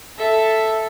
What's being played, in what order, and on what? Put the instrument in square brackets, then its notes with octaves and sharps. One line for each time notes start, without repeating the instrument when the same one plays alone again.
[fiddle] A4 E5